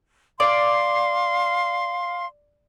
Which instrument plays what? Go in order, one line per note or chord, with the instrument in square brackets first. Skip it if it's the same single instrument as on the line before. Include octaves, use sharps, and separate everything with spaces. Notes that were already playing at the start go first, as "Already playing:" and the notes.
[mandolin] D5 [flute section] F5 C6